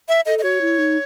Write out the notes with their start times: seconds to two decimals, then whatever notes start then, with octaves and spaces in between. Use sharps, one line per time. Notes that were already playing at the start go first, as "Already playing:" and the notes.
0.09 E5
0.26 A4 D#5
0.39 D#5
0.43 F#4 C#5
0.61 E4
0.78 D#4